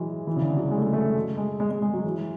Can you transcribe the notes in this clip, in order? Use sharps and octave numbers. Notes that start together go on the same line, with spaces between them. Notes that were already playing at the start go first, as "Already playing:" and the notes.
Already playing: E3 F#3 G#3
E3
C#3
D3
F#3
G#3
A3
G#3
A3
G#3
G#3
G#3
G#3
G#3
F#3
E3